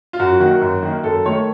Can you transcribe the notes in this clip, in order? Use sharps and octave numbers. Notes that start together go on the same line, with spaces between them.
F4
F#2 F#4
D#3 A#3 F#4
F#2
D#3 A#3
F#2 A4
D#3 A3 C#5